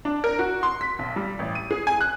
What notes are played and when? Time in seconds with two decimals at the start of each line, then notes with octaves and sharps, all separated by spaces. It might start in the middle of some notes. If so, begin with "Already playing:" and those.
0.05 D4
0.24 A#4
0.39 F#4
0.63 C6
0.81 B6
0.99 B1
1.16 G3
1.39 A1
1.55 D#7
1.71 G#4
1.87 G#5
2.01 F#6